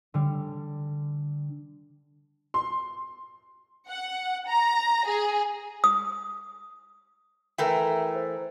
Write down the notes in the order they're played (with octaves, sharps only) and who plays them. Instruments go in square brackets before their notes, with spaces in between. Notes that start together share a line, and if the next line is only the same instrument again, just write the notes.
[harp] D3 G3
[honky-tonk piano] C6
[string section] F#5
A#5
G#4
[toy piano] D#6
[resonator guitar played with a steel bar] E3 A3 A#4 [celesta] B4 E5 G5
[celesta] C5